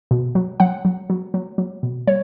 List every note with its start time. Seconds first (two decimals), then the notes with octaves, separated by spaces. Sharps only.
0.11 B2
0.35 F#3
0.60 F#3 F#5
0.85 F#3
1.10 F#3
1.34 F#3
1.58 F#3
1.83 B2
2.07 G3 C#5